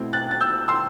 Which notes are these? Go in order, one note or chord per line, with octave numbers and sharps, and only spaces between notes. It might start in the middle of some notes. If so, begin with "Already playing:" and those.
Already playing: B2 A3 C4 E4
F#6 A6
A6
E6 G6
C6 E6